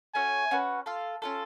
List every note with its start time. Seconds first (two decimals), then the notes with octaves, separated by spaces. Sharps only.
0.15 A3 C#4 F#4 C#5 G#5
0.51 C#4 F#4 B4
0.86 F4 A4 F5
1.22 C#4 F4 A4